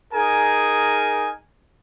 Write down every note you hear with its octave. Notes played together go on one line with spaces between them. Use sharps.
D#4 G#4 A#4 G#5